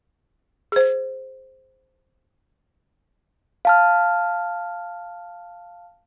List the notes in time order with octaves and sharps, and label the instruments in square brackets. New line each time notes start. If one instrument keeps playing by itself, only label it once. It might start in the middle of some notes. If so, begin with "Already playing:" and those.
[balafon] G#4 C5
[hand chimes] F5 A5 F6